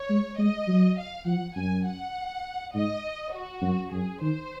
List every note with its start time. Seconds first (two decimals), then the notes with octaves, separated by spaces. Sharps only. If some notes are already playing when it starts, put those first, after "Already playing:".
Already playing: C#5
0.10 G#3
0.38 G#3 D#5
0.68 F#3
0.98 F5
1.26 F3 F#5
1.56 F#2 G#5
1.86 F#5
2.75 G#2 D#5
3.33 F#4
3.62 F#2
3.92 F#2 G#4
4.21 D#3 C5